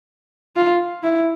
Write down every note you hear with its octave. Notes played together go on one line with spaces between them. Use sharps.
F4
E4